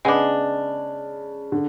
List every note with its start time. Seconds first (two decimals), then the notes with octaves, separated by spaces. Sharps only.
0.05 C#3 G#3 B3 D4
1.52 D3